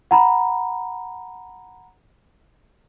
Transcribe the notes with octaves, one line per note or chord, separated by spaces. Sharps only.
F#5 A#5 B5